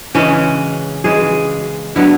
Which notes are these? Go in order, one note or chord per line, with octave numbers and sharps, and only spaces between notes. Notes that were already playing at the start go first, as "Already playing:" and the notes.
C#3 E3 G#3 C#4
C#3 E3 G#3 G#4
D3 F#3 B3 E4